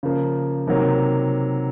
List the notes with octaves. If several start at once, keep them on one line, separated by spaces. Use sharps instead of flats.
C#3 F3 A#3
C3 D#3 F#3 A#3